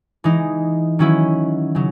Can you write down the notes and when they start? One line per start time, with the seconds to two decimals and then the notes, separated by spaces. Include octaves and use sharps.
0.24 E3 G#3 D#4
0.99 D#3 F#3 C#4 E4
1.75 C#3 F#3